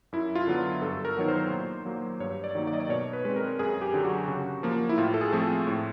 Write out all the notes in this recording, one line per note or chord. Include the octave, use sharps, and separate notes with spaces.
F#2 E4
F4
D3 F#3 B3
G2 A4
A#4
D#3 F#3 B3 C#5
C5
A#2
F#3 A#3
G2 C#5
D5
D#3 F#3 A#3
D5
D#5
D5
B2 C#5
B4
G#3 C4 B4
A#4
F#2 G#4
G4
D3 F#3
F#4
C#3
F3 A#3
E4
A2 F4
A4
G#4
F3 A3 C4
A2